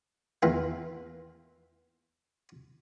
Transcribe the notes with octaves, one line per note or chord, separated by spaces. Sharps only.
E2 D#3 A#3 E4 F4 B4